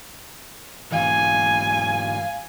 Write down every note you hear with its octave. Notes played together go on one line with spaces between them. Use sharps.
G#2 E3 F5 G#5